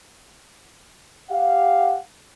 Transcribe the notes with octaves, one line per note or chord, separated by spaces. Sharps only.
G4 F5 F#5